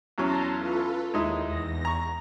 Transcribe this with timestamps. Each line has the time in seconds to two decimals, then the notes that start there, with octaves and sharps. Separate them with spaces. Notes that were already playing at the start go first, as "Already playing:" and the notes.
0.18 E2 F#3 C#4 A5 A#5 C6
0.56 F4 A4 B4
1.14 D#2 G#3 D#4 E4
1.44 E2 A#6
1.85 A#5 C#6